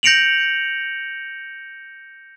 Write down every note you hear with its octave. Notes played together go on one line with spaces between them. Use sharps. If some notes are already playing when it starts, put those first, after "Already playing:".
G6 A#6 C#7 D7 F7 F#7